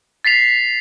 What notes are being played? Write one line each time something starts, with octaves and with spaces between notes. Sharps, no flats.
A6 B6 C7 F7